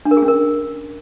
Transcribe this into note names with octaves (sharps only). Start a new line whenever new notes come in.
D4
A#4
G#4
C#4
A#4